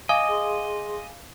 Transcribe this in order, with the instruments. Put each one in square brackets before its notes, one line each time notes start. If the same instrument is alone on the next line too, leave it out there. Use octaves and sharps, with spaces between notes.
[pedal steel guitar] D#5 [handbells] F5 [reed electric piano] G#5 D6
[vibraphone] G#4 C6